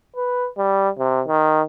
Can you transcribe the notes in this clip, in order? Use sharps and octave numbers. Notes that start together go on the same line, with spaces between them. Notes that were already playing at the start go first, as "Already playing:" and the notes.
B4
G3
C3
D#3